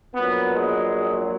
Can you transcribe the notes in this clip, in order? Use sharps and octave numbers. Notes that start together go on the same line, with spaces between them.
A#1 A#2 F#3 B3
G#3